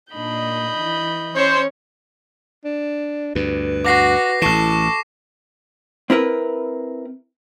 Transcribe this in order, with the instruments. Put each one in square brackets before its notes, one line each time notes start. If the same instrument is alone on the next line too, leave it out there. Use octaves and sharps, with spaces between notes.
[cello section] A#2 D4 D#4 [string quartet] D#5 B5 G6
[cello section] E3
[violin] C#4 C#5 [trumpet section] C5
[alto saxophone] D4
[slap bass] D2 G2 [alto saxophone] B4
[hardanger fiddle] F#4 [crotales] D6 A#6 C7
[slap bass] A1 E3 [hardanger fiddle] A4 [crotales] C#6 C7 E7
[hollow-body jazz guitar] C4 E4 A#4 B4